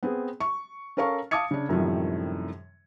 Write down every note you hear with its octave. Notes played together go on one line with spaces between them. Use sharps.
B3 C4 G#4
C#6
C#4 A4 A#4 F5 C#6
F5 A5 D6 D#6 G#6 C#7
C#3 D4
F#2 A2 C3 D#3 F3 G3